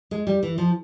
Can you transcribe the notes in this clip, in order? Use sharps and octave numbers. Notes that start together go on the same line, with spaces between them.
G#3
G3
E3
F3